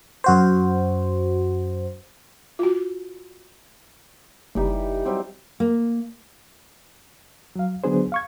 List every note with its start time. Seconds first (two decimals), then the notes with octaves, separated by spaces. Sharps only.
0.24 F#2 F#4 C5
2.59 F4 F#4
4.55 F#1 E3 G3 D#4
5.05 F#3 G3 C4
5.60 A#3
7.56 F#3 F5
7.84 D3 F#3 B3 D4 G#4 C5
8.12 F5 C#6 G#6